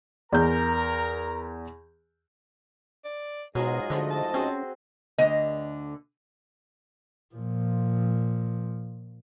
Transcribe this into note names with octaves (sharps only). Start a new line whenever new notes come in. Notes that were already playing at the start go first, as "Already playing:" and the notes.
E2 A#4 A#5 G6
D5
G#2 B2 F#3 G#3 F4 G#4 D#5
D3 F3 G#3 A3
A5
C4 C#4 F#4 G#4
D2 D3 D#5
A#2 F3